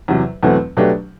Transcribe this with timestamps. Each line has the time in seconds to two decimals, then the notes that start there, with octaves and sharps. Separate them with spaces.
0.08 E2 C3 F#3
0.43 E2 B2 F#3 A3 C4
0.77 B2 F#3 A3 D4 G4